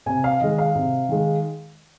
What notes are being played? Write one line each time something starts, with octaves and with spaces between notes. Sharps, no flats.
C3 G#5
F5
D#3 G#3 D#5
F5
C3
D#3 G#3